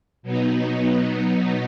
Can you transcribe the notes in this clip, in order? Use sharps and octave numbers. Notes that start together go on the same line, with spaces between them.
B2 F#3 B3 D#4